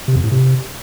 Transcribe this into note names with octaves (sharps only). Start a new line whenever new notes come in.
C3
F2
A2
C3